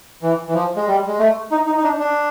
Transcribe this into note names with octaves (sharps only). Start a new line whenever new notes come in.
E3
E3
F3
G#3
G3
G#3
A3
D#4
D#4
D#4
D4
D4